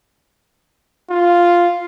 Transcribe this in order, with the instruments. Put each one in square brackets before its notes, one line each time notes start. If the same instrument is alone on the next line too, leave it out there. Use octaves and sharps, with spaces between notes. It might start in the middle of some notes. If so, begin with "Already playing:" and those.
[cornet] F4